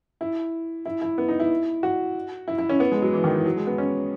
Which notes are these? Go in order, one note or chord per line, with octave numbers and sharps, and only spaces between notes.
E4
E4
E4
B3
D#4
E4
F#4
E4
E4
C#4
B3
G#3
F#3
E3
D#3
E3
F#3
G#3
B3
C#4